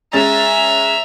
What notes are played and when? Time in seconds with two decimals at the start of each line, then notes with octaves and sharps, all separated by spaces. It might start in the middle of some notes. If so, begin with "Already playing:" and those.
0.13 G#3 C#4 E5 A#5 A6